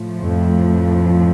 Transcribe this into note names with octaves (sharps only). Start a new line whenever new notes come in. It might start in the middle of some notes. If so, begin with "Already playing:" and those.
Already playing: A2 F3 A3
F2